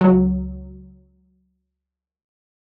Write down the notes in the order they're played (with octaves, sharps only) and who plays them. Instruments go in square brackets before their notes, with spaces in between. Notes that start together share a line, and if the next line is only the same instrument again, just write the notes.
[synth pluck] C#2 F#3